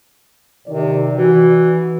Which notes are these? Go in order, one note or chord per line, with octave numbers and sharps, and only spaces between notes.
C3 D#3 D5
E3 F#4